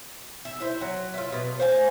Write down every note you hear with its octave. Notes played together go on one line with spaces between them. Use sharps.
E5
E4 C5
F#3
E4 F4
B2
C5 F5 G#5